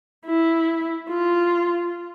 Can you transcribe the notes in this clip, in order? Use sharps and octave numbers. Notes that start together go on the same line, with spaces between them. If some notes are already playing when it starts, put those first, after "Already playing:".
E4
F4